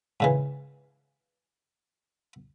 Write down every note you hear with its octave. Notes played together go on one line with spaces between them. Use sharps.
G#2 C#3 E3